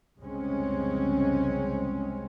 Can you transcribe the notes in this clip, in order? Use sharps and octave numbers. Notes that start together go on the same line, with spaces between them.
F1 C2 C#3 G#3 C4 C#4